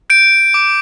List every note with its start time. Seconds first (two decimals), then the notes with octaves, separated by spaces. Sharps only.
0.10 G6 D7
0.54 D6